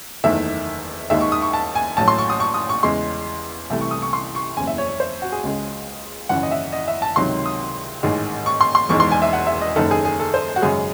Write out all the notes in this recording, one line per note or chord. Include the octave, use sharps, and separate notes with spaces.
F#1 E2 D#3 A3 E5
D#2 D#3 G#3 E5
C#6
D#6
C#6
A5
G#5
A1 A2 F#3 A5
C6
C#6
D#6
C#6
D#6
C#6
E2 C#3 G#3 C6
C2 C3 E3 A3
C#6
D#6
C#6
C6
C#6
F#1 E2 C#3 G#5
E5
C#5
C#5
C5
F#4
G#4
C#2 C#3 G#3
G#1 F#2 C#3 E3 F#5
D#5
E5
D#5
E5
A5
C#2 C3 D#3 F#3 C6
D#6
A1 G#2 D#3 G#3
C#6
C6
C6
E1 E2 D#3 G#3 C#6
C6
G#5
E5
F#5
E5
D#5
F#1 F#2 D#3 A4
G#4
G#4
A4
C5
F#4
G#1 F#2 C#3 G#3 G#4